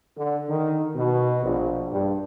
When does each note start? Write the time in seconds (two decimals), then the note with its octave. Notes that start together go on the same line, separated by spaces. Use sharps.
0.17 D3
0.49 D#3
0.95 B2
1.43 A#1
1.92 G2